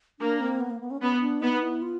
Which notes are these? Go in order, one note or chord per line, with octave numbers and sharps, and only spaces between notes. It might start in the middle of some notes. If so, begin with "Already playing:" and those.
A#3 D4
C4
B3
A#3
B3
C#4
B3 C#4
C#4
D4
B3 D#4
E4
F4